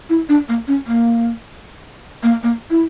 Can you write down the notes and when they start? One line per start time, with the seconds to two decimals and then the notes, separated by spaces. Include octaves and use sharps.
0.10 E4
0.29 D4
0.49 A#3
0.68 C#4
0.87 A#3
2.23 A#3
2.43 A#3
2.70 E4